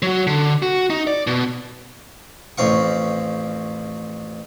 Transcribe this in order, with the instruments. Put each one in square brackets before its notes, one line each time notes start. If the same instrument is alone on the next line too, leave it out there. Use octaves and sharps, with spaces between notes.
[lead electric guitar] F#3 F#4
D3
F#4
D#4
D5
B2
[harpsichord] A1 F2 F3 F5 C#6